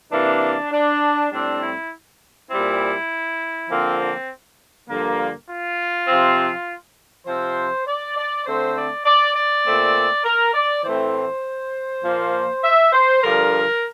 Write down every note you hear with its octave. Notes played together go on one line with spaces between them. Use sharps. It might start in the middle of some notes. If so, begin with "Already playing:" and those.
C3 E3 A#3 D4
D4
A2 G3 C4 D4
E4
A#2 G3 C4 E4
D3 F3 A#3 C4
C4
G2 D3 F3 A#3
F4
C3 F3 C4
C3 F3 C4 C5
D5
D5
D3 A3 C4 C5
D5
D5
D5
A#2 A3 C4
A#4
D5
A2 E3 A3 C4 C5
A#2 F3 A#3
E5
C5
G2 D3 F3 A#4